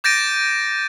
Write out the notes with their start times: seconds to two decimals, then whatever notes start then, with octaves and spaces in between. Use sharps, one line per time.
0.04 D6 G6 A6 A#6 D7 D#7